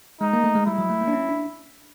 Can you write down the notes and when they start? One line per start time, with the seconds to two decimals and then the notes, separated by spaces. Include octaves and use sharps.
0.21 G#3 D#4
0.33 A#3
0.44 A3
0.55 G#3
0.66 G3 E4
0.78 F#3
0.90 A3
1.01 A#3
1.08 D4
1.13 C#4
1.29 D4